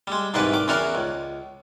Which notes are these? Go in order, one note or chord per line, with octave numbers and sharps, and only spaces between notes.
G3 G#3
C2 G#2 D#3 E3 B4 D5
D#3 D6
E2 C#3 E3 F#4 A#4 D5
C#2